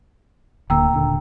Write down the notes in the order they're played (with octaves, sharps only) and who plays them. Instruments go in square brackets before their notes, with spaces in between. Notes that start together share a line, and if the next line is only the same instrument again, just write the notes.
[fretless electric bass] D1 D3 A#3 [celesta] G5 A#5 E6
[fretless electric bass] D#1 D3